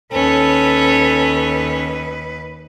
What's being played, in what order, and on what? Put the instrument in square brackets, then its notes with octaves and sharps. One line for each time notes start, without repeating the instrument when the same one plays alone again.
[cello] D#2 B4 [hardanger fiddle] C#4 [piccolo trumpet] A4